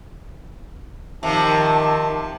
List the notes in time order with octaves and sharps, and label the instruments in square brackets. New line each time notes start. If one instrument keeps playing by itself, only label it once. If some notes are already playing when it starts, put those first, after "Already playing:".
[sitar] C3 F3 [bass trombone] D#3 [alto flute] A5